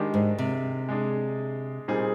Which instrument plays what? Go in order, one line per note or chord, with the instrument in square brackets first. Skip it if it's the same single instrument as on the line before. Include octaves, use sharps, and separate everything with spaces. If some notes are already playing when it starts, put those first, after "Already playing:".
Already playing: [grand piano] D#3 G#3 D4 G4
[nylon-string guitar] G#2
C3
[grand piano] G#3 D4 G#4
A#2 G3 C4 D#4 G#4